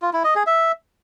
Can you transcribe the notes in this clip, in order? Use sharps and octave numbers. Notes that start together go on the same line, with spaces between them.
F4
E4
D#5
G#4
E5